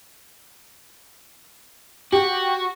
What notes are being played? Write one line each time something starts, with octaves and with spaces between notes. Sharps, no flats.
F#4 G4